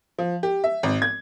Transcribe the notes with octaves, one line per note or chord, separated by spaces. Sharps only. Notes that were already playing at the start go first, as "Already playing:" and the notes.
F3
G4
E5
G#1
G#6